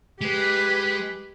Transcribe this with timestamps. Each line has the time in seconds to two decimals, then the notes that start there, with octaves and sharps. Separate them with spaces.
0.21 G#3 G4 B4